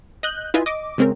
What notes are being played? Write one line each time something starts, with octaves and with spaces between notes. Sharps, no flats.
D#5 F#6 G6
E4 F4 B4 D#5 G#5
D#5 D6
C#3 G#3 C4 C#4 A#4